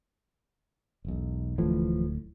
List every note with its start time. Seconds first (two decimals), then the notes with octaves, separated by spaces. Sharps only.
1.05 E1 B1
1.58 D1 A2 E3 F3